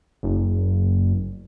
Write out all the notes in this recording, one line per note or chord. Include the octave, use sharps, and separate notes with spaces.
F#1